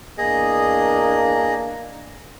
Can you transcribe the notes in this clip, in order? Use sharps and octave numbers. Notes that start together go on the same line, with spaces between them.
E2 A#3 D4 G#4 D#5